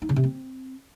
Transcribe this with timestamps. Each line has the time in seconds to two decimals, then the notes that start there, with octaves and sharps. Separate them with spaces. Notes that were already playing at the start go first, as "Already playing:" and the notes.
0.02 D#4
0.09 C#3
0.16 C3
0.24 C4